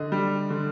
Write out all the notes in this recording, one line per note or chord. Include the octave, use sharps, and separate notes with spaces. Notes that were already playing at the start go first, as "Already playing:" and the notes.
Already playing: D3 D#5
G3
D3